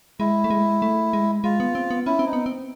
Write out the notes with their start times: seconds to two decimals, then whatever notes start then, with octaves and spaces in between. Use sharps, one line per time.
0.20 G#3 E4
0.44 A3
0.50 G#3
0.82 A3
1.13 G#3
1.44 G#3 F4
1.60 B3
1.75 C4
1.91 B3
2.06 C#4 E4
2.19 C4
2.26 D#4
2.33 B3
2.46 C4